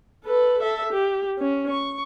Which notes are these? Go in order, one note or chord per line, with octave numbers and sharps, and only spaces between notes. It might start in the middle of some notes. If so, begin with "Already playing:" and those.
A4 B4
A4 E5
G4
C#4
C#6